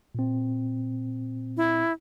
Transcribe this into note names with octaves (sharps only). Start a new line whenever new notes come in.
A#2 C4
E4